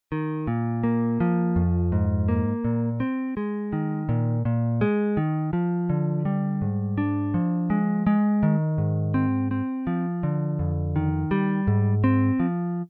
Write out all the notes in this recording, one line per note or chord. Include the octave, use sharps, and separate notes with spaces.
D#3
A#2
A#3
F3
F2
G#2
A#3
A#2
C4
G#3
D#3
A#2
A#2
G#3
D#3
F3
D3
G3
G#2
D4
F3
G#3
G#3
D#3
G#2
C4
C4
F3
D3
F2
D#3
G3
G#2
C4
F3